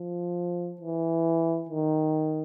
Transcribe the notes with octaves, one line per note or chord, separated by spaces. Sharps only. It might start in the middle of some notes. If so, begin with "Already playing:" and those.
Already playing: F3
E3
D#3